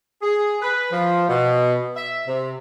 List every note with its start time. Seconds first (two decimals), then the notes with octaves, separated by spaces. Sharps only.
0.22 G#4
0.62 B4
0.91 F3
1.28 B2
1.96 E5
2.27 C3